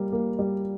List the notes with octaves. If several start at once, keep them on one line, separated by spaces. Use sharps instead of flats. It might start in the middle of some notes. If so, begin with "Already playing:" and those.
Already playing: G3 A#3
A#3
G3